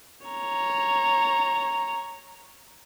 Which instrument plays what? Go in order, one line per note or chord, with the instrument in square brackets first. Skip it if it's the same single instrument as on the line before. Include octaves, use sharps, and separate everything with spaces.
[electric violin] C#5 A#5